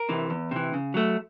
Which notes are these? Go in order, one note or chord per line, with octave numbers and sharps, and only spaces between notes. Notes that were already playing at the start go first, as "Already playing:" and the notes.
Already playing: A#4
C3 E3
E2
C3 E3
C#3
F#3 A3